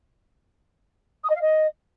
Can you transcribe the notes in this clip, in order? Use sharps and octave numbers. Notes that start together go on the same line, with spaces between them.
D#6
D#5
F5
D#5